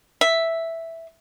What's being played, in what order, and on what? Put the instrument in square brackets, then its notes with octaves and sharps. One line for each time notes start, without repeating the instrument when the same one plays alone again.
[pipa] E5